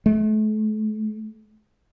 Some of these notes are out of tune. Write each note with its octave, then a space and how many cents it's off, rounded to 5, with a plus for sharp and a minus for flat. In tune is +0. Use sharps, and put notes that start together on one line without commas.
A3 -35